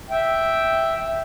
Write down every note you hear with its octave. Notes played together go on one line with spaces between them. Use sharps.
E5 G5